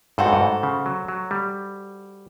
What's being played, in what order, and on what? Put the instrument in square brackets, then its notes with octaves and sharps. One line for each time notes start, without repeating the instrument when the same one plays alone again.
[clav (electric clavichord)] G2 [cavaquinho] F#4 A4 C5
[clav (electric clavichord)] G#2
G2
G#2
C#3
F#3
F#3
G3